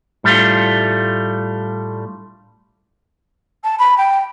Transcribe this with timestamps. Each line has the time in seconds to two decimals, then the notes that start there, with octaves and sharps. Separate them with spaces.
0.24 A2 G3 A3 D4 F4
3.64 A5
3.79 B5
3.98 G5